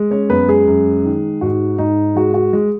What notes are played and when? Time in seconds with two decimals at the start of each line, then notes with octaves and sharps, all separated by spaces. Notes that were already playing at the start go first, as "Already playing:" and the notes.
Already playing: G#3
0.11 C#4 C#5
0.30 F#2 B3 B4
0.48 G#3 G#4
0.67 F#2
1.05 D#3
1.41 G#2 F#4
1.78 G#2 D#4
2.15 G#3 F#4
2.34 F#4
2.53 G#3